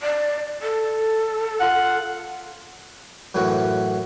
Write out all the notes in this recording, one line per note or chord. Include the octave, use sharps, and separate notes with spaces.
D5
A4
F4 F#5
F#2 A2 E3 C#4 F#4